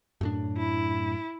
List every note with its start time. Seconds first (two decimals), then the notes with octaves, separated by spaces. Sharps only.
0.21 F#2 A2 D4
0.58 E4